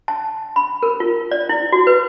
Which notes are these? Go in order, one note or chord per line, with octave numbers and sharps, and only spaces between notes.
A5
B5
A#4
F4
D5
E4
F#4
B4